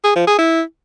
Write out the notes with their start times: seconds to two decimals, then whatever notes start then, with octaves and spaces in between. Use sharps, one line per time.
0.04 G#4
0.16 F3
0.27 G#4
0.39 E4